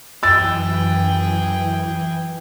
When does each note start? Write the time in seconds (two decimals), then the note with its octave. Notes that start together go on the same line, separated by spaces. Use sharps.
0.23 F#2 E3 G#4 G5 E6 A6